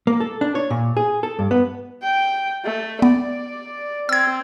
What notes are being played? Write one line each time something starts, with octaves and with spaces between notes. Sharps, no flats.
A#3
A4
D4
C#5
A#2
G#4
A4
G2
B3
G5
A3
B3 D5
C4 E6 G#6